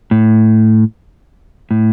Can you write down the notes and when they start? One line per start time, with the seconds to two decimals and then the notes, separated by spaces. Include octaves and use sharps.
0.11 A2
1.71 A2